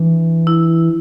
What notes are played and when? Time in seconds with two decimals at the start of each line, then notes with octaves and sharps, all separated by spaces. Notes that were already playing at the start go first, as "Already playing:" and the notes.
Already playing: E3 D4
0.47 E4